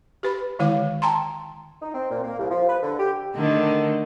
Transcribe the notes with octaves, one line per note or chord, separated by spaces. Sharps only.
G4 B4 B5
D3 D#3 G#3 E4 F5
G5 A5 A#5 C6
D#4
C4
A#2
A#3
C2
F3
B4
D3
G4
D3 D#3 A3